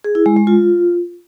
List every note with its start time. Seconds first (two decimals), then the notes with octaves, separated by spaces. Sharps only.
0.04 G#4
0.15 E4
0.26 G#3
0.36 G#3
0.47 F4